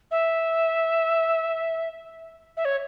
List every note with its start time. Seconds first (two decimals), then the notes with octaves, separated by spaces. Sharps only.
0.11 E5
2.57 E5
2.65 C#5